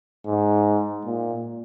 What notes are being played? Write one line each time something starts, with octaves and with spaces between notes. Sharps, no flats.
G#2
A#2